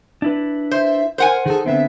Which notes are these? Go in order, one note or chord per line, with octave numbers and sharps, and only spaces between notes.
D4 E4 B4
C5 E5
A#4 C5 F#5 G#5
D#3 G#4 A4
D3 B3 C4 E5